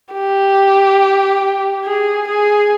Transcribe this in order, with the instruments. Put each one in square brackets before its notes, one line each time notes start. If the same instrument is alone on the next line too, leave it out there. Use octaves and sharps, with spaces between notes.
[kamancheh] G4
G#4
G#4